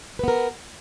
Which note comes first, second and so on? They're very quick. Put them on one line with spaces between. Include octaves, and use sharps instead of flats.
B4 B3 A#4